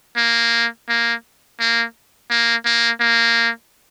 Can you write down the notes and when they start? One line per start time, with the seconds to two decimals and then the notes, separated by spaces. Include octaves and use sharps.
0.17 A#3
0.89 A#3
1.60 A#3
2.30 A#3
2.65 A#3
3.00 A#3